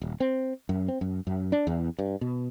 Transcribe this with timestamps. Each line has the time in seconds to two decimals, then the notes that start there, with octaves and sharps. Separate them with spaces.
0.02 D#1
0.20 C4
0.69 F#2
0.88 C4
1.01 F#2
1.27 F#2
1.52 D4
1.67 E2
1.99 G2
2.21 B2